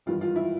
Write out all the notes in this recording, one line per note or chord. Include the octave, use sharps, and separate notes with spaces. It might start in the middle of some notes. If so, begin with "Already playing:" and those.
G#1 G2 E3 F4
F4
E4